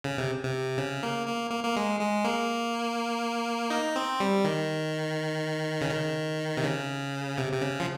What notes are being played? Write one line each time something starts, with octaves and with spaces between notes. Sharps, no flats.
C#3
C3
C3
C#3
A#3
A#3
A#3
A#3
G#3
G#3
A#3
D#4
C4
G3
D#3
C#3
D#3
C3
C#3
C3
C3
C#3
F3